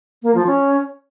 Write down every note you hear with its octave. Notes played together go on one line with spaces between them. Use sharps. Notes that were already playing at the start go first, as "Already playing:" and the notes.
A#3
F3
C#4